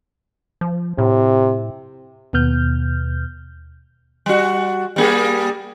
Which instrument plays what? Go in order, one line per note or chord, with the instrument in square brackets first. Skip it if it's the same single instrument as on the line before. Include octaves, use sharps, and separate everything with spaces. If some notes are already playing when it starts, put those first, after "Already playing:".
[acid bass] F3
[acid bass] A2 [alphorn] C3
[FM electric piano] D#2 B2 B3 F6 G6
[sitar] G3 F#4
G3 A#3 G#4